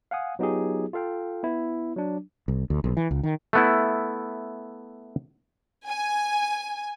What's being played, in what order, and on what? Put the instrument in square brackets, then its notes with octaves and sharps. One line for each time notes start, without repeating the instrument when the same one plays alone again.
[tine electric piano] F5 F#5 G#5 D#6
F#3 B3 D#4 F4 G4 G#4
F4 A4 F5 G5
B3 E4
F#3 D4
[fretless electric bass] C2
D2
B1
E3
C#2
D#3
[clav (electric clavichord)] A3 B3 E4
[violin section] G#5